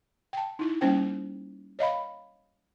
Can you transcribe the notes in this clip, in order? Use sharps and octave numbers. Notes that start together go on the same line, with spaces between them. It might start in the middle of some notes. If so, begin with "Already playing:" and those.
G5 A5
D#4 E4
G3 A#3 C#4 C5 G5
C#5 D#5 F5 B5